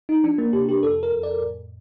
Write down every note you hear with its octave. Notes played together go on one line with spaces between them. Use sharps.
D#4
F3 D4
A#3
C3 G4
G4
F2 A4
A#4
F2
D5
A2